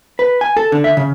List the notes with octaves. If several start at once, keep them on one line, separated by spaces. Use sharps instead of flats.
B4
G#5
A4
D3
E5
C#3